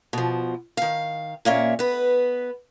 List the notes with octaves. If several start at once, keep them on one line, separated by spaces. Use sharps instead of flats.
B2 F3
D#3 F5
A#2 A#3 C#4 E5
B3 B4